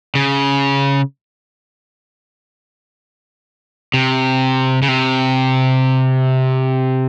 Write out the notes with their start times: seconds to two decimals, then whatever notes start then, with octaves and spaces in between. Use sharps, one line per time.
0.15 C#3
3.94 C3
4.82 C#3
4.88 C3